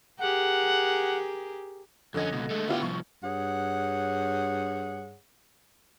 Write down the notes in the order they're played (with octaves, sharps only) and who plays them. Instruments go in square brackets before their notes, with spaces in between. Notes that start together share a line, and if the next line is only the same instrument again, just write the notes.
[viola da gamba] G4 G#4 A#4 [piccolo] F#5
[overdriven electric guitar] F2 C#4 [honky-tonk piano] D3 D#5 G#6
[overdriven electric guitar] C#2 B2
G#3 A3
[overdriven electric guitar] D3 G4 [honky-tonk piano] B3 E4 F4
[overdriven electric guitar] C2 F3 [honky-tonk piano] C#6
[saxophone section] G2 G#4 C#5 F#5